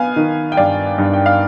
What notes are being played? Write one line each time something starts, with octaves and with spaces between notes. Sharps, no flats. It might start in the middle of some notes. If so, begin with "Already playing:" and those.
Already playing: B3 F5 G#5
D#3
G5
G2 D5 F5
G2
G5
F5